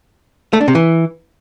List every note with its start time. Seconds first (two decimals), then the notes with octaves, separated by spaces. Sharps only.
0.53 A3
0.60 D4
0.68 C3
0.75 E3